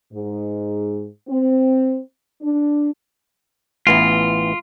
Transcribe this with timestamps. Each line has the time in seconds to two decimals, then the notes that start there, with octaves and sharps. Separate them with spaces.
0.13 G#2
1.28 C4
2.41 D4
3.87 A1 E3 B3 F4